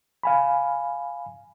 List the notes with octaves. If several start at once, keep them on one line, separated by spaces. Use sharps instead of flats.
F5 G#5 B5